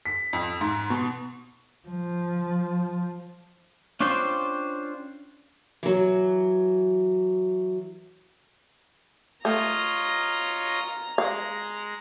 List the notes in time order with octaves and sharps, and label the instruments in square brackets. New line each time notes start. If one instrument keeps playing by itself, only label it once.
[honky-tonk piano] B6
F2
G#2
B2
[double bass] F3
[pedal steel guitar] C#4 D4 F4 C5 G5
[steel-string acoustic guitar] E3 F#3
[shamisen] A3 [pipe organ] F4 C#5 D#5 [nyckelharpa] A#5
[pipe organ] G#3 [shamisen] F5